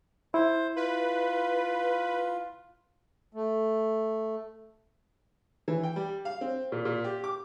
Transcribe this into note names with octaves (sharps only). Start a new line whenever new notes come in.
E4 C5
F4 B4
A3
E3
G5
G3
F5
C4
A#2
A#2
G4
D6